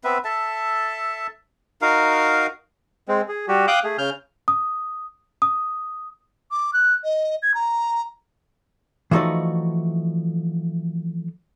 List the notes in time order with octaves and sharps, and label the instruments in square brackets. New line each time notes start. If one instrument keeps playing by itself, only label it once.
[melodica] B3 C4 B4 E5
A4 E5 A5
D#4 F#4 A#4 F5
[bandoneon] G#3 C4
G#4
G3 F#4 G4
F5 G5 D6 D#6 F#6 G6
A3 G#4
C#3 F6 G6
[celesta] D#6
D#6
[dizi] D6
F#6
D#5
G#6
A#5
[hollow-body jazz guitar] E3 F3 A3 D#4 F#4 D5